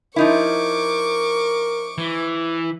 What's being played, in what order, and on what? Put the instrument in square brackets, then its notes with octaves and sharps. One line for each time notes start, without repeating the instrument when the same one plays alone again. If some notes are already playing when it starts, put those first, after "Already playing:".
[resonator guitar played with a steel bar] F3 D#4 E4 [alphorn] A#4 [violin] C#6 D6
[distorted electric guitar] E3